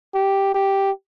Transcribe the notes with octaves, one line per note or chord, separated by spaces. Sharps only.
G4
G4